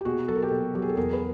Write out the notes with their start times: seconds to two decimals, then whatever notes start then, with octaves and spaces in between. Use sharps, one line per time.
0.01 G4
0.05 B2 F#4 G#4
0.28 F#3 A4
0.35 A#4
0.42 G4 A4
0.51 B2
0.74 F#3 G4
0.82 G#4
0.89 A4
0.97 E2 G#4 A#4
1.13 B4